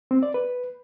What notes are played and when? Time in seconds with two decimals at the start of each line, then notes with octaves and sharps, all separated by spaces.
0.11 C4
0.23 D5
0.34 B4